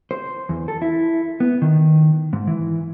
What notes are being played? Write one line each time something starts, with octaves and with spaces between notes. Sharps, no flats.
C5
E2
A4
E4
B3
D#3
G#2
E3